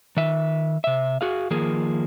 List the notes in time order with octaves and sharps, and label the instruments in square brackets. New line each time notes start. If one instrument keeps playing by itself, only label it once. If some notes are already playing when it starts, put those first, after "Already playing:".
[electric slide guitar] D#3 E5
C3 E5
F#4 G#4 F5
D#3 F3 A#3 G#4